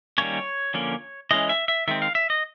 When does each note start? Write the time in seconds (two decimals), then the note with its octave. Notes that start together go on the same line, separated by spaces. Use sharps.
0.18 D#3 G3 A#3 C#4 C#5
0.74 D3 F3 A#3 C#4
1.31 E3 G#3 C#4 D#5
1.49 E5
1.68 E5
1.88 D#3 G#3 C4 E5
2.02 F5
2.15 E5
2.30 D#5